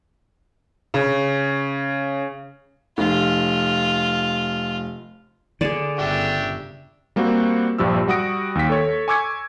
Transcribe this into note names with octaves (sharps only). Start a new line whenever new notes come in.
C#3
F1 F4
D3 G#4 D5
G1 C#3 D4 G4 E5
G3 A#3 C4 F#4
A#1 G2 F3 G4 E6
G3 F#4 F#5 D#6 A#6 D7
D#2 B6
A4 C#5
G#5 C#6 D6 E6 G#6 C#7